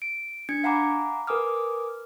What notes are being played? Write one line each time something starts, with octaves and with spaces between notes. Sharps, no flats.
D7
D4 G#6 C#7
F5 F#5 G#5 A#5 B5 D6
A#4 B4 G#5 D6 D#6 F6